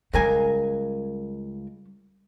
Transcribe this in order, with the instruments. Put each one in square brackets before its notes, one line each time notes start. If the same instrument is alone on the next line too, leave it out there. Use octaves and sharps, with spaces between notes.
[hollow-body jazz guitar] C#2 A#4 G#5 [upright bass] G3